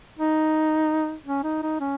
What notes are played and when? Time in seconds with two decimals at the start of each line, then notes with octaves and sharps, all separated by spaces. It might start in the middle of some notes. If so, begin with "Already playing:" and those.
0.19 D#4
1.26 C#4
1.43 D#4
1.62 D#4
1.80 C#4